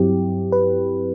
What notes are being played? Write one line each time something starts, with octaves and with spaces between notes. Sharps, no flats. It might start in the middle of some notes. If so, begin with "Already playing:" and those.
Already playing: G2 F#3 C4 E4 G4
B4